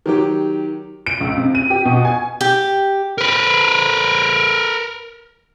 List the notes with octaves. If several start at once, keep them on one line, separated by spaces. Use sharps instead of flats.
D#3 F#3 G4
D7
C#2
C3
D#7
G4
B2
G#5
G4
A#4 B4